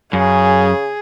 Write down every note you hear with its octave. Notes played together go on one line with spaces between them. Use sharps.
F#2 C#3 G#4